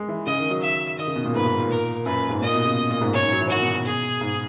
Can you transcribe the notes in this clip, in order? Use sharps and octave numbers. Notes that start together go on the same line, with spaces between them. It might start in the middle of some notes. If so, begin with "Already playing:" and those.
Already playing: G#3
E3
C#3 D#5
D#3
F#3
E5
D#3 D#5
C#3
B2
A#2
G#2 B4
G#2
A#2
A#4
F#2 B4
G#2
A#2 D#5
B2
C#3
B2
A#2
G#2
F#2 C#5
G#2
F#3
E3
D#3 F#4
B2
B2
G#4
G#2